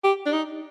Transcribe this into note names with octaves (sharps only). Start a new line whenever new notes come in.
G4
D4
D#4